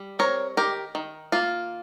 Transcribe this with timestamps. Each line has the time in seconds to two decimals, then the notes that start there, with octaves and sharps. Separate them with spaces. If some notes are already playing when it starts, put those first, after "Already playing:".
Already playing: G3
0.19 C4 A#4 C#5
0.57 D#3 G4 A#4
0.95 D#3
1.32 A#3 F4